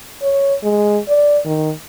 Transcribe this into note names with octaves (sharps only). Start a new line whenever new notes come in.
C#5
G#3
D5
D#3